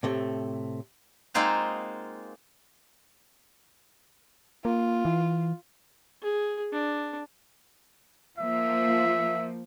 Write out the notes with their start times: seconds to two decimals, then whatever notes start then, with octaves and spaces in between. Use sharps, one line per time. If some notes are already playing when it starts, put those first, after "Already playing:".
0.03 A2 C3 A3
1.34 G#3 A#3 C4 D#4 F4 F#4
4.65 A#3 F4
5.05 E3
6.22 G#4
6.72 D4
8.38 F3 A#3 E5